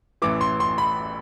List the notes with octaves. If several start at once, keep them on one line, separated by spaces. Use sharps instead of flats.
A1 A2 E3 D6
C6
C6
B5